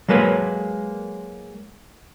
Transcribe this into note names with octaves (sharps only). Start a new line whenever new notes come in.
F#3 G#3 A#3 B4 C#5